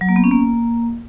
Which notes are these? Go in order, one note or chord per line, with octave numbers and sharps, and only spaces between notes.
F#3
A#3
B3
C#4
A#3